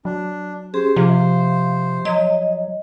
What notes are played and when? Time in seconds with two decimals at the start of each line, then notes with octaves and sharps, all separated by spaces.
0.05 F#3 D4
0.74 C#4 G4 G#4 C5
0.96 C3 F3 F5
2.05 F#3 D#5